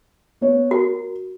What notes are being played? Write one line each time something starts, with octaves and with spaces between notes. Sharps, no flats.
B3 C#5
F#4 A#4